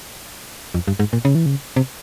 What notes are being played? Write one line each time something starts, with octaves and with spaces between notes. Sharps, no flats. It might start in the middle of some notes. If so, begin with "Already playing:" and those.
F2
G2
G#2
A#2
C#3
E3
C#3
C3